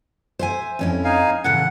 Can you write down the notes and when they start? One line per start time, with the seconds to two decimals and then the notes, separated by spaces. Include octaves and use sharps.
0.39 C5 E5 G#5
0.79 F2 C#4 E4
1.04 D#4 F5 G#5
1.44 A2 C#3 E3 F#5